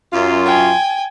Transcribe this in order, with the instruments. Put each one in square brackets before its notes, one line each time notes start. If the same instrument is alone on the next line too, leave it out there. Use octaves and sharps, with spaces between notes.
[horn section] F#2 F4
[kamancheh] G5 G#5